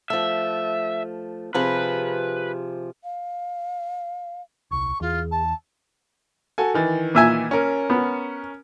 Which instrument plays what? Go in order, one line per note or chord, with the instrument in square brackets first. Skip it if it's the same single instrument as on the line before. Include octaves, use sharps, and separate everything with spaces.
[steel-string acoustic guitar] F3 A3 [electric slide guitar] E5
[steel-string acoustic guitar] C3 F3 G#4 [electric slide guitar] B4
[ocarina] F5
[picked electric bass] D#1 C2 [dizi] C#6
[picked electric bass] E2 [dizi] F4 [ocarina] G#4
[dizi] A5
[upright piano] F#4 A4 G#5
D#3 E3 A6
[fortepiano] A#2 E5 G#5
[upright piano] C#4 A#4
[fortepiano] B3